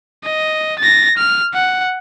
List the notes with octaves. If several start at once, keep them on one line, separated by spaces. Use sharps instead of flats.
D#5
A6 A#6
F6
F#5